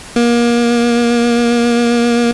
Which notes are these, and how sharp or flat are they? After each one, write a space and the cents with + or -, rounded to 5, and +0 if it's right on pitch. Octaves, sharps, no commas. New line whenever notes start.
A#3 +30